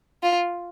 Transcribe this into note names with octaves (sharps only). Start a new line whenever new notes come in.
F4